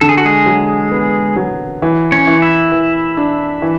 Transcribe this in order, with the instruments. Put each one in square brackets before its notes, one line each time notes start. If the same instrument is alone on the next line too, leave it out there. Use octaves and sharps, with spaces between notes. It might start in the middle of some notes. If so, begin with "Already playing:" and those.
[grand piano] D3 [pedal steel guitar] A4
[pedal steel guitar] G#4
F#4
G#3 G#4
[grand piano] F#3
B3
F#3
E3
[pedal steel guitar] C#4 C#5
[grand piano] E3
[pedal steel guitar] E4 E5
[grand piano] E3
D4
E3